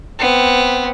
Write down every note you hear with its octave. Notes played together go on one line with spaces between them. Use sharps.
B3 C4